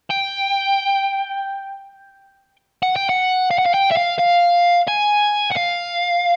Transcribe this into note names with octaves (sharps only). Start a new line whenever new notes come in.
G5
F#5
G5
F#5
F5
F#5
F5
G5
E5
F5
F5
G#5
F#5
F5